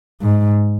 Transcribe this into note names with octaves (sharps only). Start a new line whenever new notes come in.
G#2